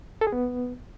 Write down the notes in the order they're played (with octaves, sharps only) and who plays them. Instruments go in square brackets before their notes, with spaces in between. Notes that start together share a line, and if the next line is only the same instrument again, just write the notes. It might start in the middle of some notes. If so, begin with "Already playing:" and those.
[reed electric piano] A4
G#4
B3